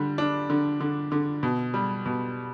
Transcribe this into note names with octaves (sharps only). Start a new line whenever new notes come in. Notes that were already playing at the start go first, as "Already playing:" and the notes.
Already playing: D3 G3
D4
D3
D3
D3
B2
G3
B2